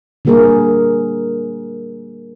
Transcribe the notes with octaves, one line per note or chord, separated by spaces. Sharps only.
D3 G3 A#3 G#4 A#4